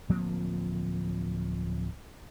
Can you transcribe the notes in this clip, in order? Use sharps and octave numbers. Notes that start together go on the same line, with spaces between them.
D1 F3 A#3 C4